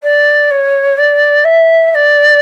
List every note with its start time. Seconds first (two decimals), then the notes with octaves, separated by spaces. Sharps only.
0.02 D5
0.50 C#5
0.97 D5
1.44 E5
1.91 E5
1.94 D5